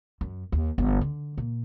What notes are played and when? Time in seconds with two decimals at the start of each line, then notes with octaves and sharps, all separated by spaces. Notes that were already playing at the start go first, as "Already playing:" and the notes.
0.21 F#2
0.52 D#2
0.78 G1 E3
1.01 D3
1.38 A#2